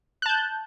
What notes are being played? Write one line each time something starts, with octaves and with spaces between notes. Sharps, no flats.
A5 F#6 G6